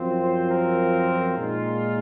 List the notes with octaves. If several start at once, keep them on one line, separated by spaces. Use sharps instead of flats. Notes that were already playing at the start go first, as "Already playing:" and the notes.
Already playing: F#2 F3 C4 F4
C5
A#4
A#2 G#3 D#4 F4